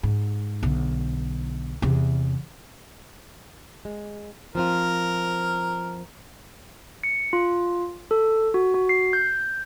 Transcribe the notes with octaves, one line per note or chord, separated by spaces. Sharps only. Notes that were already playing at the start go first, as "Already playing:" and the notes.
G#2
B1 D3
E2 C3
G#3
F3 C4 F4 A#4
C#7
F4
A4
F#4
F#4
C7
G6